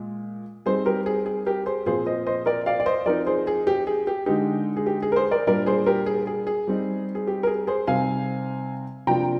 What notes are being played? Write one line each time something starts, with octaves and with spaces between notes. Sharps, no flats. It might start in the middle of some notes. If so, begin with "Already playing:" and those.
Already playing: A#2 G#3
G3 C4 D#4 G#4 C5
G4 A#4
G#4
G#4
G4 A#4
G#4 C5
A#2 F3 C4 F4 G#4 C5
C5 D#5
C5 D#5
A#4 D5
D5 F5
D5
C5 D#5
F3 C4 D#4 A#4 D5
G#4 C5
G#4
G4
G#4
G4
D3 G#3 D#4 G4
G#4
G4
G#4
A#4
G#4 C5
A#4 D5
A#2 G3 D4 A#4 D5
G#4 C5
G4 A#4
G#4
G#4
G#4
G3 C4 D#4
G#4
G4
A#4
G#4
G#4 C5
C3 G3 C4 D#4 F5 G#5
C3 F3 A#3 D4 F4 G5 A#5